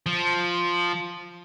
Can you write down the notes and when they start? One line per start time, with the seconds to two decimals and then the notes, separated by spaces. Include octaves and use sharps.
0.06 F3